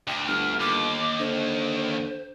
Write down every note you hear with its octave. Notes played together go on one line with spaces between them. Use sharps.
D2 G5
G1 F6
D#2 D6
D3 C5